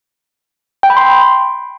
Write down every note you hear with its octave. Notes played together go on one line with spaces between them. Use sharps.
G5
B5
C6